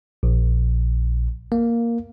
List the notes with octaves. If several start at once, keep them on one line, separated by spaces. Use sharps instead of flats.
A#1
A#3